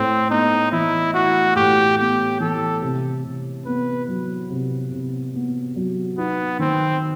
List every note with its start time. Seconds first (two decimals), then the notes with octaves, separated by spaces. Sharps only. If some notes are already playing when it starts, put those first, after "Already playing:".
Already playing: A2 C4 E4
0.30 B3 D#4
0.72 E3 E4
1.14 E4 F#4
1.56 A2 G4
1.98 B3 G4
2.40 E3 A4
2.81 C3
3.24 C3
3.66 B3 B4
4.08 F#3
4.50 C3
4.92 C3
5.34 B3
5.76 F#3
6.18 B3 D#4
6.59 D#3 C4